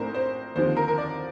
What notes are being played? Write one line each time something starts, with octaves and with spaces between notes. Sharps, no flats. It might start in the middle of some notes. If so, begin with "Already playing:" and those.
Already playing: A#1 A2 A3 D4 A#4 C5
C5
D#2 D3 F3 C4 C5
A#4
A#4
D5